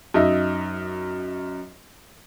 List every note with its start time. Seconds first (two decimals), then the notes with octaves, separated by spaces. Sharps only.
0.14 F#2 D#4 D#5 E5